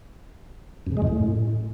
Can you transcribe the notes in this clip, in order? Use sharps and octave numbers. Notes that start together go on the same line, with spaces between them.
F#2
C#3
G#3
F#2
A2